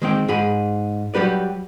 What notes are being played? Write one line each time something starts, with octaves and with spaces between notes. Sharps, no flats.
D#3 G#3 C4 G5
G#2 G#4 B5
F#3 G3 G4 B4 D5